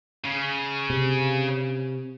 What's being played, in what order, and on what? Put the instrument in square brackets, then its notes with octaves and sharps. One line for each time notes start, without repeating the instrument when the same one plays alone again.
[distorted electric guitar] C#3
[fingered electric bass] C3